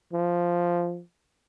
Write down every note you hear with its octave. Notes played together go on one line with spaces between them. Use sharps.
F3